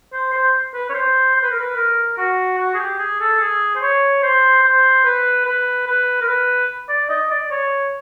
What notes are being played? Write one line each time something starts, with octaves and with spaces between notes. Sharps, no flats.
C5
C5
B4
C#5
C5
C5
B4
A#4
B4
A#4
F#4
F#4
G#4
G4
G#4
A4
G#4
C5
C#5
C5
C5
B4
B4
B4
A#4
B4
D5
D#5
D5
C#5